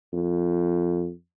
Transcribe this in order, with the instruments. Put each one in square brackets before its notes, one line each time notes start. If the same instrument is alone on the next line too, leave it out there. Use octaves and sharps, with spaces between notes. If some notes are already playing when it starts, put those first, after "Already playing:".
[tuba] F2